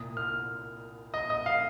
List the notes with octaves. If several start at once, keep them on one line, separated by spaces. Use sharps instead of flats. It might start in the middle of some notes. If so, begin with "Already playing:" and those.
Already playing: C2 A#2 D#6
F6
D#5
D#5
F5